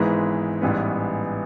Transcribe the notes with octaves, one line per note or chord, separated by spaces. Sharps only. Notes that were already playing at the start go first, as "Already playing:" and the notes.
Already playing: G#1 G#2 E3 G#3 B3
A1 G#2 E3 G3 B3